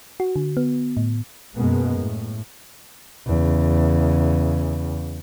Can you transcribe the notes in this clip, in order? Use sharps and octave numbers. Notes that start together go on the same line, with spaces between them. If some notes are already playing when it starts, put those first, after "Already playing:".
F#4
D3
B3
A2
F#2 B2 G#3 A#3 B3
A2
E2 C#3